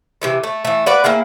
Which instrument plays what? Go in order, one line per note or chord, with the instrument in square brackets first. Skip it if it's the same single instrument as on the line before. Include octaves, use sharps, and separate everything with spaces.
[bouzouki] C3 E3 A3
A3
E3 A3
F#4 B4 D5 F#5
A#3 C4 E4 G#4